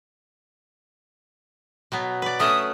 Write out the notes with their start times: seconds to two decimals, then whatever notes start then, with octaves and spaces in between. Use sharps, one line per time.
1.92 B2 F#3 B3
2.22 B4 D5
2.40 A3 C#4 E5 D#6